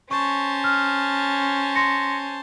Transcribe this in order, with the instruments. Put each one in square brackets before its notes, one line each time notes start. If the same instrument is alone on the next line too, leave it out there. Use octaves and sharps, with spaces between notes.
[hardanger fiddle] C#4 [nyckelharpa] C5 A5 [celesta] C#6
[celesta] F6
C6 A#6 C#7